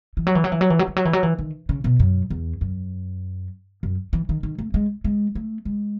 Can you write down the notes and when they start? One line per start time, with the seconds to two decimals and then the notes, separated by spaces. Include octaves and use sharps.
0.17 E3
0.27 F#3
0.35 E3
0.44 F#3
0.52 E3
0.61 F#3
0.70 E3
0.79 F#3
0.88 E3
0.96 F#3
1.05 E3
1.13 F#3
1.23 E3
1.39 D#3
1.69 C#3
1.84 B2
1.99 F#2
2.30 E2
2.61 F#2
3.83 F#2
4.13 E3
4.29 D#3
4.43 D#3
4.59 A3
4.74 G#3
5.04 G#3
5.35 A3
5.65 G#3